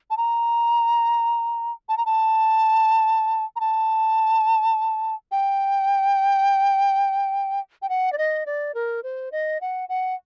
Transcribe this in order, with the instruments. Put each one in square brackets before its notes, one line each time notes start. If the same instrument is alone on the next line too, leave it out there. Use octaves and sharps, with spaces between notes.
[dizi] A5
A#5
A5
A#5
A5
A#5
A5
G5
G5
F#5
D5
D#5
D5
A#4
C5
D#5
F#5
F#5